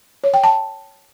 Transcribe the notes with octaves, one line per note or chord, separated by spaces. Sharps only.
C#5
G5
A5